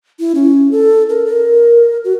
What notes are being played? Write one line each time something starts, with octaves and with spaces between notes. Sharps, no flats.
E4
C#4
A4
A#4
A#4
F#4